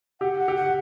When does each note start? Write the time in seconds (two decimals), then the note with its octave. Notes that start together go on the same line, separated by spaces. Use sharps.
0.21 G4 F#5
0.39 F#5
0.48 G4
0.56 F#5